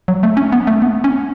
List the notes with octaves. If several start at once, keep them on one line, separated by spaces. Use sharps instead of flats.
F#3
A3
C#4
B3
A3
B3
C#4